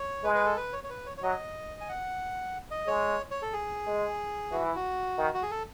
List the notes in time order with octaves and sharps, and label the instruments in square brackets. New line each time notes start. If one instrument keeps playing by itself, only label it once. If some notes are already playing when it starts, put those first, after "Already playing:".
Already playing: [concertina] C#5
[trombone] G#3 [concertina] B4
[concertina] B4
A4
B4
C#5
C#5
B4
C#5
C#5
[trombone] F#3 [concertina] D#5
[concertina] G#5
F#5
D#5
[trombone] G#3 [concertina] C#5
[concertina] C#5
A4
G#4
[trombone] G#3
[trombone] E3 [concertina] F#4
[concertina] E4
F#4
[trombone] D#3
[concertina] F#4
G#4
A4